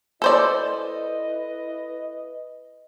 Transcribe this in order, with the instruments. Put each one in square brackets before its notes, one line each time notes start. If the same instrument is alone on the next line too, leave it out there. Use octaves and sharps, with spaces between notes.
[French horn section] E4 B4 D#5 [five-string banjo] A4 C5 D5